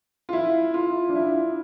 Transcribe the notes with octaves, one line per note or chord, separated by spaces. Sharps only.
F4
E4
F4
D4
E4